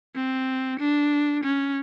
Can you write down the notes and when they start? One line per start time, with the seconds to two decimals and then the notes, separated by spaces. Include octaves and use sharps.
0.16 C4
0.79 D4
1.44 C#4